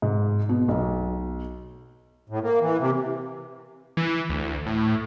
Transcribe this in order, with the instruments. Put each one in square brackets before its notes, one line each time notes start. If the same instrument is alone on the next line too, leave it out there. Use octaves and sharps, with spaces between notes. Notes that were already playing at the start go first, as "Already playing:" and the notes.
[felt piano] G#2
B2
B1
[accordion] A2
A#3
E3
C3
[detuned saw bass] E3
D2
A2